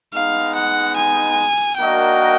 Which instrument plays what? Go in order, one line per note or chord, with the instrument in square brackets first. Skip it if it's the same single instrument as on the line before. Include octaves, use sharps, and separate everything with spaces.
[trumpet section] G#3 B3 D#4 [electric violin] F5
[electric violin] F#5
G#5
[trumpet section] A#3 D4 F#4 A#4 D#5 [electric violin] G5